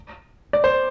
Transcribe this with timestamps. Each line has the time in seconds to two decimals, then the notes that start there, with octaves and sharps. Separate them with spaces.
0.53 D5
0.64 C5